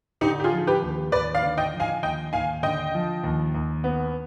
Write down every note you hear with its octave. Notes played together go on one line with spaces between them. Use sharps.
D3 D#4 G4
G4
F4 G#4
F3
G4 B4
D#2
D#2 B4 D5
D5 F5
D3
D#5 G5
F3
F5 G#5
D#2 D#5 G5
D#2 F5 G#5
D3 D#5 G5
F3
D#2
D#2
B3